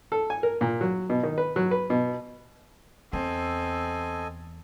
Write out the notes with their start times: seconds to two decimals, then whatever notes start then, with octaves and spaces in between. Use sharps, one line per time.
0.12 A4
0.30 G#5
0.43 A#4
0.61 A#2
0.81 F#3
1.10 B2
1.23 D#3
1.38 B4
1.56 F#3
1.71 B4
1.90 B2
3.13 E2 C4 A4 D#5 G#5